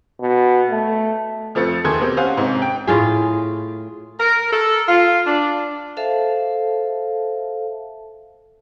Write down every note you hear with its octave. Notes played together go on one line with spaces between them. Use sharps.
B2
A3
F2 F3 A3 A6 C#7
D#2 A3 G#4 A4 C6 G#6
B2 A#3 C4 G4
C#4 C5 F5 F#5 G#5
G#2 C3 C4 C#4
G5
A2 F4 G#4
A#4
A4
F4
D4
A4 C5 E5 F5 A5